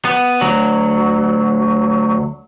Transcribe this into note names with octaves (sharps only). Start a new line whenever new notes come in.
B3
D2 F#3